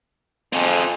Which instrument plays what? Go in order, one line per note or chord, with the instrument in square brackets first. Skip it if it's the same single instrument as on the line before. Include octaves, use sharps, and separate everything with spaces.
[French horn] F2 [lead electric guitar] C4 G#4